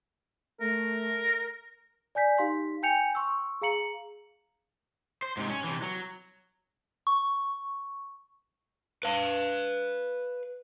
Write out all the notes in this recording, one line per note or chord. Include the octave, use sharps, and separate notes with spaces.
A3 A#4
D5 G#5 G6 B6
D#4 G4 F5 C6 B6
G5 G#5 G6 C#7 F7
C6 C#6 E6
G#4 F5 A#5 C#7 F#7
C5
G#2 C3
C#4
C3 E3
F#3
C#6
B4 F5